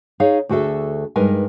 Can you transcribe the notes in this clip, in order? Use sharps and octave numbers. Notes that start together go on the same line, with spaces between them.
D#4 G#4 C#5 F5
D2 F#4 G#4 A4 E5
G2 G#3 D#4 A#4 B4 G#5